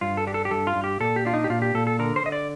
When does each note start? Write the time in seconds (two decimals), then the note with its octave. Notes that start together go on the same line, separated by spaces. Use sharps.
0.01 G2 F4
0.17 A4
0.27 D4 G4
0.34 A4
0.45 G4
0.51 G2 A4
0.67 F4
0.76 G2
0.84 G4
1.00 A#2 A4
1.16 G4
1.25 D4 F4
1.34 D#4
1.44 G4
1.49 A#2 F4
1.62 G4
1.74 A#2 A4
1.87 A4
1.99 D3 A#4
2.16 C5
2.24 D3 D#5
2.32 D5